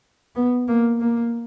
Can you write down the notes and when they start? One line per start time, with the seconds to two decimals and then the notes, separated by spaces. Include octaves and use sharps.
0.36 B3
0.68 A#3
1.00 A#3